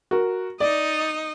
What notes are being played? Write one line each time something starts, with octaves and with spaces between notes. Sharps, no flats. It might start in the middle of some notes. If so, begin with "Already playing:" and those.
F#4 A#4
D#4 D5 D#5